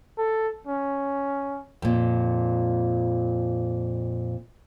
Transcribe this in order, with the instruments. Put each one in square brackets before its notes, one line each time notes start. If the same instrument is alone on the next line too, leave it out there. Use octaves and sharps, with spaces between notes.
[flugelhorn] A4
C#4
[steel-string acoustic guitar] F2 A#2